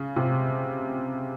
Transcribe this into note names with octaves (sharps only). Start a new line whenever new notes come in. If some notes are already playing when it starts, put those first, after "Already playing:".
Already playing: C#3
C3